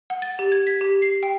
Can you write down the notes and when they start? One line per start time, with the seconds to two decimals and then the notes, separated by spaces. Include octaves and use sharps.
0.10 F#5
0.22 A6
0.39 G4
0.52 G#6
0.67 B6
0.81 G4
1.02 C7
1.23 G5